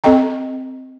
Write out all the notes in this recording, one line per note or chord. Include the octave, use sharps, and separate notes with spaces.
C4 A4 D#5 G5 A#5